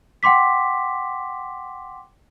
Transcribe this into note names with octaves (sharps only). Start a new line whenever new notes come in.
F#5 G5 C6 D6 B6